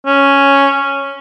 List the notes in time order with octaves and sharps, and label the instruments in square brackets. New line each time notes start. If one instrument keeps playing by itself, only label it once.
[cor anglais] C#4